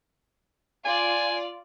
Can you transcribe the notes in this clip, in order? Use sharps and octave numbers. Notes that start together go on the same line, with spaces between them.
F4 D5 G#5